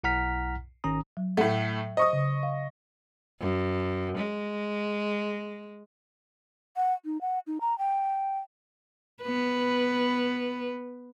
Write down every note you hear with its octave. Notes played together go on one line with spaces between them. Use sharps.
B1 E4 F#5 A#5 F6 B6
G#1 D#3 C#4 A#5 D#6
F#3
A2 A3 F#5
C5 D#5 C#6 D#6
C#3
F5
F#2
G#3
F#5
D#4
F#5
D#4
A#5
G5
B3 B4